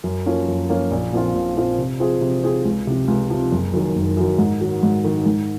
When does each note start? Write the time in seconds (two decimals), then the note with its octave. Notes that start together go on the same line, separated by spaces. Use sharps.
0.04 F#2
0.26 F3 A#3 C#4
0.48 F#2
0.69 F3 A#3 C#4
0.91 A#1
1.13 A#2 F3 C4 F4
1.34 A#1
1.56 A#2 F3 C4 F4
1.78 C3
2.00 F3 C4 F4 G#4
2.21 C3
2.43 F3 C4 F4 G#4
2.65 C#2
2.87 C3 F3
3.08 C#2
3.30 C3 F3
3.52 F#1
3.73 F#2 D#3 F#3
3.95 F#1
4.17 F#2 D#3 F#3
4.38 G#2
4.60 D#3 F#3
4.83 G#2
5.04 D#3 F#3
5.26 G#2